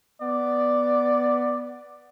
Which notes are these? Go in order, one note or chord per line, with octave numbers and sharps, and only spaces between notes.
B3 D5